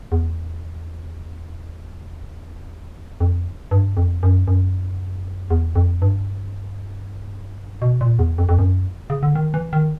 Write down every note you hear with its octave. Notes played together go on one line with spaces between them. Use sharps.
E2
F2
G2
F2
F#2
F#2
E2
F2
G2
B2
A#2
E2
F2
F2
F#2
C#3
D3
D#3
E3
D#3